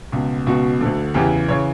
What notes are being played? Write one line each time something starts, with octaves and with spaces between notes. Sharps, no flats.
C#2 B2
C#2 B2 F#4
D2 D3
E2 C#3 E3 G4
C#3 E3 C#5